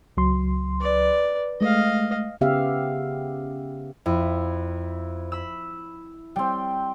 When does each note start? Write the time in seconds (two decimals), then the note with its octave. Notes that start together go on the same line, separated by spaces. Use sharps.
0.17 C#2 F#3 C6
0.80 B4 D5
1.61 G#3 A3 D#5 F5
2.41 C#3 B3 G4 E5 F5
4.06 F2 E4
5.32 B5 E6
6.36 G3 C4 G5